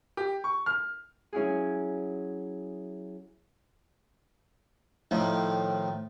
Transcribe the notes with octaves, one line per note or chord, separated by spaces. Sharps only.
G4
C#6
F6
F#3 C#4 E4 F#4 G#4
A2 D#3 F3